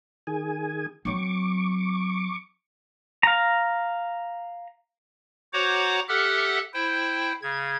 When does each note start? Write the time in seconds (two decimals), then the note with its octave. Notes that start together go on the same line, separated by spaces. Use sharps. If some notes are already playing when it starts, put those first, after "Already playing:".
0.27 D#3 G#4 G#5
1.05 F#3 C4 C#6 D6
3.23 F5 A#5
5.53 F#4 C5 C#5 F#5 A#5 D6
6.09 G4 A4 E5 F#5 F6 F#6
6.74 E4 C5 G5
7.42 C#3 G#6